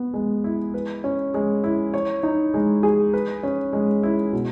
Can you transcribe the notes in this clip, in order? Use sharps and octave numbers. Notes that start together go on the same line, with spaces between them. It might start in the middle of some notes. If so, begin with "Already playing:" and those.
Already playing: B3
G#3
E4
B4
C#4
G#3
E4
C#5
D#4
G#3
G#4
B4
C#4
G#3
E4
B2